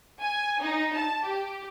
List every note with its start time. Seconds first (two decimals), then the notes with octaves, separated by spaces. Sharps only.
0.21 G#5
0.61 D#4
0.95 A5
1.26 G4